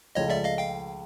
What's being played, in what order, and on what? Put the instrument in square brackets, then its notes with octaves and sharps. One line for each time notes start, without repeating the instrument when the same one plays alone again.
[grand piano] C#2 C#3 F3 A3 [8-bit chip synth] C#5 D#5
[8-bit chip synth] D5 E5
D#5 F5
F5 G5